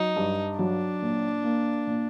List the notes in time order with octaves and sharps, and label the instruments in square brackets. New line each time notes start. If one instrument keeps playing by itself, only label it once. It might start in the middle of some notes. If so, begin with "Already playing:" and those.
Already playing: [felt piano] F#3 [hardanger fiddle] D#4
[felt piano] G2
[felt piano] F#3 [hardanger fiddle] D4
[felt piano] A#2
A#3
A#2